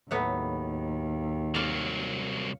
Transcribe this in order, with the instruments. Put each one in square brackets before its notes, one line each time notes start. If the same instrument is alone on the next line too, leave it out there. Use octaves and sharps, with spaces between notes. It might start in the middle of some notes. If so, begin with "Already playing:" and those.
[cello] D#2 [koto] A2 F#3 B3
[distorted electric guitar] C2 F#3 [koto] D5 F5